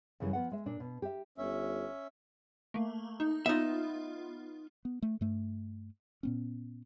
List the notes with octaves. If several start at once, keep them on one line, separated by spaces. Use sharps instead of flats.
F#2 C#3 E3 G3
F3 B3 F#5
G#3 E5
A#2 D4
B2
G4 E5
G1 C#4 E5
A3 A#3
D#4
B3 D#4 F4 E5
B3
A3
G2 A3
A#2 B3 C#4